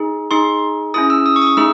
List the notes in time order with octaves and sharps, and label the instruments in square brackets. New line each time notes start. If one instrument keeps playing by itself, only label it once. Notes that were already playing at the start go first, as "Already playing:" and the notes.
Already playing: [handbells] D#4 G#4
D#4 G#4 C6
C#4 E4 G#4 D#6
E6
D#6
C#6
D#6
C#6
A3 D#4 G#4 E6